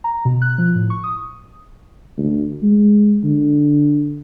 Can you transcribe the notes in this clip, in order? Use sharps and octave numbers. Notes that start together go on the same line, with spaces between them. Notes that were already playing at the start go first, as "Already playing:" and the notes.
A#5
B2
F#6
F3
A2
C#6
D#6
D2
G#3
D3